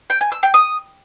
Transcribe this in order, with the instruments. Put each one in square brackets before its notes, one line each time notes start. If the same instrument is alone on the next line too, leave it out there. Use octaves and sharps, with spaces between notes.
[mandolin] G5
G#5
E6
G5
D#6